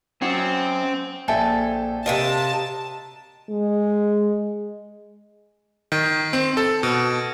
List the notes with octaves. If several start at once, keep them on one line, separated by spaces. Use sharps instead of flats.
F#3 C4 C#4 F#5
A#1 A4 E5 G5 G#5
C3 A#4 D#5 F5 A5
G#3
D#3
C4
A4
B2